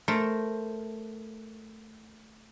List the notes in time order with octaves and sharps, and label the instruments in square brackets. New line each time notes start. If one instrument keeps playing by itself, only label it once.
[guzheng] A3 A#4 C5